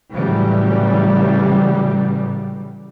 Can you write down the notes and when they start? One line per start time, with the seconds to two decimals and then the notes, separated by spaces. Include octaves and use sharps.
0.14 A2 C#3 E3 F#3 G3